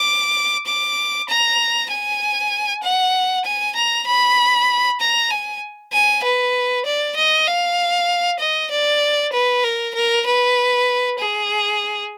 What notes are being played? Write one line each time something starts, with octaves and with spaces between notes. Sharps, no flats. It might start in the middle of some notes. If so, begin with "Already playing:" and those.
Already playing: D6
D6
A#5
G#5
F#5
G#5
A#5
B5
A#5
G#5
G#5
B4
D5
D#5
F5
D#5
D5
B4
A#4
A#4
B4
G#4